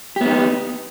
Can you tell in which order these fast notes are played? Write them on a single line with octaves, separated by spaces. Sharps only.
G4 B3 D#4